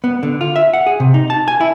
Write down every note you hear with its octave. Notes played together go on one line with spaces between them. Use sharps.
B3
D3
F4
E5
F#5
G#4
C3
D#4
A5
G#5
E4